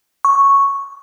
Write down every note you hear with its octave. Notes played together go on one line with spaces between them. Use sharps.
C#6